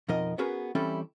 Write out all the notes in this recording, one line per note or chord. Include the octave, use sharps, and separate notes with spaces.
F2 B2 F3 D#4 A#4 D#5
B3 C#4 F#4 G#4 A#4 B4
E3 G3 C4 C#4 E4 A4